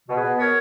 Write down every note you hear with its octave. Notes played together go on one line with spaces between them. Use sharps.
B2
G#4 B4
B2
B3 A#4 C#5